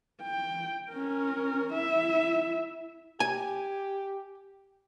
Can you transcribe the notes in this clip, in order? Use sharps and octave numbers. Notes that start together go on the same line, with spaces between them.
G5
C#4 A#4
E4 E5
G4 G#5